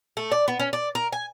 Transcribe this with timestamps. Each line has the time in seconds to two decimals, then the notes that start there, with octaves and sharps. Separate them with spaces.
0.17 A3
0.32 D5
0.48 B3
0.60 C#4
0.73 D5
0.95 A#4
1.13 G#5